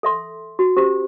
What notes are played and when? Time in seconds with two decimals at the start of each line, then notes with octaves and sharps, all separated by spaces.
0.03 A4 E5 C6
0.59 F#4
0.77 C#4 G4 C5